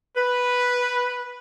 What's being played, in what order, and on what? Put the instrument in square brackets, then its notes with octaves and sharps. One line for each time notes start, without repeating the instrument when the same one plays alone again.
[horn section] B4